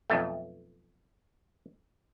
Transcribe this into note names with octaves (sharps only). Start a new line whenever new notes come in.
B1 F2 A3